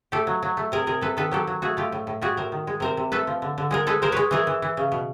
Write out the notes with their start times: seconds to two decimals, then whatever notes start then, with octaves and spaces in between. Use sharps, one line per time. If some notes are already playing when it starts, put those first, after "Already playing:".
0.12 A3 G4 A4
0.27 F#3
0.43 F#3
0.57 A3
0.72 C3 G#4 A#4
0.86 C3 G#4 A#4
1.01 C3 A4 B4
1.17 D#3 A4 B4
1.32 F#3 G4 A4
1.47 F#3
1.62 A3 F#4 G#4
1.77 A3 F4 G4
1.92 A2
2.07 A2
2.22 G3 F#4 G#4
2.37 A2 A#4 C5
2.52 D#3
2.67 G#3
2.80 C3 A#4 C5
2.97 C3
3.12 A3 A4 B4
3.27 F3
3.42 D3
3.58 D3
3.71 G#3 G#4 A#4
3.87 G#3 A4 B4
4.02 G#3 A#4 C5
4.12 G#3 B4 C#5
4.31 E3 G#4 A#4
4.47 E3
4.62 E3
4.77 C#3
4.92 B2